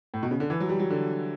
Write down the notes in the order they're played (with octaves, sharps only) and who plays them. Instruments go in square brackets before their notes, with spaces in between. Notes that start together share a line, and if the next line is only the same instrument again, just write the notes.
[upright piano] A2
B2
C#3
D3
E3
F#3
G3
F#3
D3